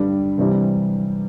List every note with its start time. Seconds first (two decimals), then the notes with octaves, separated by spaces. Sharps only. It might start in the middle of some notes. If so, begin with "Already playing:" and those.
Already playing: G2 D3 G3
0.38 C3 E3 G3